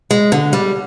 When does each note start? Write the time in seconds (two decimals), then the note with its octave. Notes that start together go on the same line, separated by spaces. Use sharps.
0.11 G#3
0.32 D3
0.53 G3